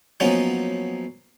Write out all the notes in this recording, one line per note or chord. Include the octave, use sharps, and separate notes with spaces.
F3 F#3 A#3 B3 C#4 D#4